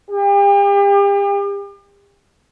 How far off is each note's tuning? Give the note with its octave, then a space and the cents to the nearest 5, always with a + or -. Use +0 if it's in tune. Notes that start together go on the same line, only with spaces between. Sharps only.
G4 +40